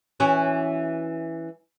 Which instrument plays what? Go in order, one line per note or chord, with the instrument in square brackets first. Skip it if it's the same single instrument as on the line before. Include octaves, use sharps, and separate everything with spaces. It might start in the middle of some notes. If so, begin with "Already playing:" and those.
[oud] E3 C#4 F#4